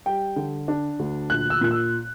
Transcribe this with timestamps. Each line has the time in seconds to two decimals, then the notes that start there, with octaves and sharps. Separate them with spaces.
0.06 G3 G5
0.36 D3
0.68 D4
0.99 D2
1.30 A#1 F#6
1.50 E6
1.61 A#2 F#6
1.71 E6